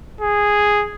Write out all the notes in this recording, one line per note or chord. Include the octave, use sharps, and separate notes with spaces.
G#4